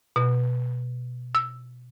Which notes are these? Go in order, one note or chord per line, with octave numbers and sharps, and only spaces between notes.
B2
E6